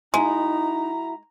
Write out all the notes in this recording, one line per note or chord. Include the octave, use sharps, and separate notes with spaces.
G#3 D#4 E4 F#4 A#5